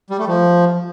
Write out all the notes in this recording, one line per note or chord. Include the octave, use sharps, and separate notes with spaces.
G3
A3
F3